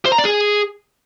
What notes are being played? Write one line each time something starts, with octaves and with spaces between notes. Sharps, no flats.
C5
A#5
D5
G#4